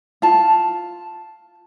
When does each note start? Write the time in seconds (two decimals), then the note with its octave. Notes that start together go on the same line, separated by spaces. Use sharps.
0.22 F4 A5